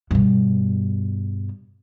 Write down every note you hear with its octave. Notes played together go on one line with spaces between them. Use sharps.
G2 B2